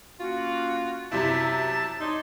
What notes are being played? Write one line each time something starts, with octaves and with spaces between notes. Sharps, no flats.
A#3 C#4 F4 F#4
F#2 C3 E4 E5 A5
D#4 C#5 D5 C6